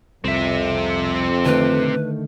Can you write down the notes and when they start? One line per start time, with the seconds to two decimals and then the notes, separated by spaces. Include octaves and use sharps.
0.24 C2 F2 C4 E5
1.46 D3 D#3 A3 B4